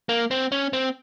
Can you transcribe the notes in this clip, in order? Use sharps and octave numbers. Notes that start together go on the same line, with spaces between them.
A#3
C4
C#4
C4